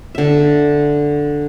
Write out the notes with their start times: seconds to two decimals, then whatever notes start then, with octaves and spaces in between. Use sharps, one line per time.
0.15 D3 E5